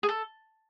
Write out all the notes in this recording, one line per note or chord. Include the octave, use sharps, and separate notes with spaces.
G#4
A4